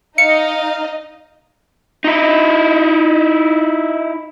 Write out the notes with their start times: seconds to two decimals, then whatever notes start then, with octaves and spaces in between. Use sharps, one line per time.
0.18 D#4 D#5 F5 C#7
2.05 D#4 E4